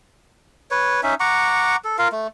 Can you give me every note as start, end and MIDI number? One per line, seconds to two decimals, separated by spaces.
0.71 1.01 71
0.71 1.01 73
1.03 1.15 61
1.03 1.15 63
1.03 1.15 76
1.20 1.76 78
1.20 1.76 82
1.20 1.76 85
1.20 1.76 86
1.85 1.97 69
1.98 2.08 65
1.98 2.08 70
1.98 2.08 77
2.12 2.27 57